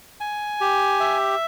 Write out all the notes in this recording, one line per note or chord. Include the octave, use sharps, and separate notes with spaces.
G#5
G4
E5